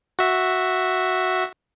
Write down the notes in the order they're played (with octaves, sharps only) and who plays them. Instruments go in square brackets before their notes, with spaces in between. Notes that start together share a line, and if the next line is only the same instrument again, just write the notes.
[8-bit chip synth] F#4 E5